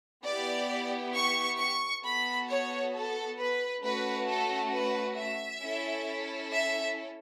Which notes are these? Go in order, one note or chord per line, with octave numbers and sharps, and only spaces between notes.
B3 E4 G4 D5
C#6
C#6
B3 F#4 A4 B5
C#5
A4
B4
A3 C#4 F#4 B4
A4
B4
E5
C#4 E4 A4
E5